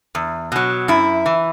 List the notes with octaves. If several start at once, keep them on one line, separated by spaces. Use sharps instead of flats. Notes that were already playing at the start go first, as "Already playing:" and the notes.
E2
B2 F#3
F#2 E4
E3